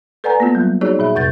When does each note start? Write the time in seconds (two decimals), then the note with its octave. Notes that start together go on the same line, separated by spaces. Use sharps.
0.24 A4 B4 D5 F#5 G#5 A#5
0.40 A#3 B3 F4
0.55 F#3 G3
0.81 D#4 F#4 G#4 C#5 D5
0.99 A#2 G#4 E5
1.15 F2 C3 G6 A6